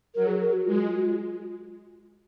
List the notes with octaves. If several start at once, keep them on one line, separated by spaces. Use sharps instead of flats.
F#3 A#4
G#4
A#4
F#4
G#3 F4
F#4
F4
F#4
F4